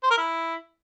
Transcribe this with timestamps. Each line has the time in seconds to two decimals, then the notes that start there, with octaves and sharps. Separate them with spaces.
0.03 C5
0.10 A#4
0.18 E4